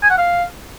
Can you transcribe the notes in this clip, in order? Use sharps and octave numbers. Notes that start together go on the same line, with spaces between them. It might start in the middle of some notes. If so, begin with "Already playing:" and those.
G#5
F#5
F5